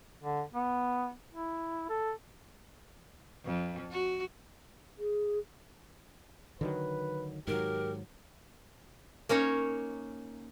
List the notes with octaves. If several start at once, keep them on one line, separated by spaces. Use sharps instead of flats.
D3
B3
E4
A4
F2
F#4
G#4
D3 D#3 F#3 B4
G#2 D#3 F#3 G4 A#4
A#3 C#4 D#4 C#5